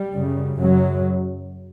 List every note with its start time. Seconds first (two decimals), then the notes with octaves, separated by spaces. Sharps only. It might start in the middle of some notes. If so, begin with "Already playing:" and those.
Already playing: G3
0.14 F#2 C#3
0.59 F#2 C#3 F#3